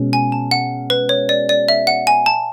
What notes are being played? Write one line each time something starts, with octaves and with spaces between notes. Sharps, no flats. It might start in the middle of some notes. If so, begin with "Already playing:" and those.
Already playing: B2 G#3 C#4
G#5
A5
F#5
B4
C#5
D5
D5
E5
F#5
G#5
A5